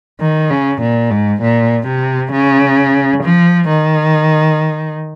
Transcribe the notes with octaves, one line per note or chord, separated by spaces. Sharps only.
D#3
C#3
A#2
G#2
A#2
C3
C#3
F3
D#3